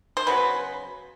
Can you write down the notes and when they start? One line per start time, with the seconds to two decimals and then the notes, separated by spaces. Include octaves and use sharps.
0.17 C5
0.27 C#3 F#3 B3 B4